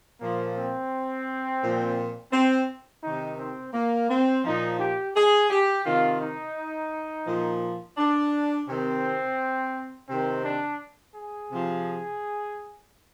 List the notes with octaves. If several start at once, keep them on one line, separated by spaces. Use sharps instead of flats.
A#2 F3 A#3
C4
A#2 F3
C4
C3 D#3 D#4
C4
A#3
C4
A#2 F3 D#4
G4
G#4
G4
C3 D#3 F4
D#4
A#2 F3
D4
C3 D#3 C4
C3 D#3 C4
D4
G#4
C3 F3